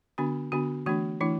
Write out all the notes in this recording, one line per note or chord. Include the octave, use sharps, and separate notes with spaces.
D3 B3 D4 F#4
D3 B3 D4 F#4
E3 A3 D4 F#4
E3 A3 D4 E4